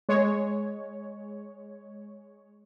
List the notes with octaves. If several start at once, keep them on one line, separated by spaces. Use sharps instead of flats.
G#3 C#5